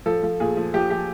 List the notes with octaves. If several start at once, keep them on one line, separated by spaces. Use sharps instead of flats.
F3 A4
F3
A#2 G#4
F3
F3 G4
F3 G4